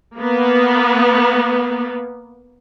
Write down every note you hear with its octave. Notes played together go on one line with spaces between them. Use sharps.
A#3 B3